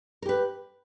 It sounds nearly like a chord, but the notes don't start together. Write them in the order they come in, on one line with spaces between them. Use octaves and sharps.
A#4 G4 B4